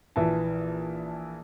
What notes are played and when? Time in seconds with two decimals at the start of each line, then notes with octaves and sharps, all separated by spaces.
0.16 A#1 E3 E5 A5